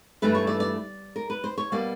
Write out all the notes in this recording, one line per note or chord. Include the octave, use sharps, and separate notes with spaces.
G2 E3 A3 B4
C#5
D5
D5
A#4
B4
C5
C#5
B2 G3 A#3 D5